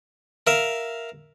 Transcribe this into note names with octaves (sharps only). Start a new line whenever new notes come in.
A#4 E5 F5